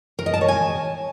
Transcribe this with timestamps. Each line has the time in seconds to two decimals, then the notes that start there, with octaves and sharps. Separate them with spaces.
0.19 A#4
0.26 D#5
0.34 A5
0.41 C#5
0.48 G#5